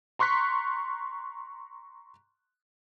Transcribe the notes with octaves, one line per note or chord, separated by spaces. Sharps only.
A#5 C6 C#6 F#6 B6